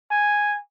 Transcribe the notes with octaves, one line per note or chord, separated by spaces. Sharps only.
G#5